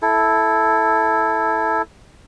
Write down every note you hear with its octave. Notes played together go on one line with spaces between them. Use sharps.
E4 A4